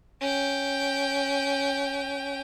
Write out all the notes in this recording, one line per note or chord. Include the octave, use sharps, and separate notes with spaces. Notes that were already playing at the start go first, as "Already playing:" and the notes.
C#4 G5